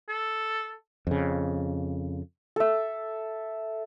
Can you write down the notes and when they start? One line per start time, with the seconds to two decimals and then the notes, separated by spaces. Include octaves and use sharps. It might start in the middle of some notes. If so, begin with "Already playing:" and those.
0.09 A4
1.07 F2 C#3
2.56 A4 E5